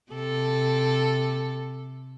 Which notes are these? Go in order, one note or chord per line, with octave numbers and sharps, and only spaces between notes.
C3 A4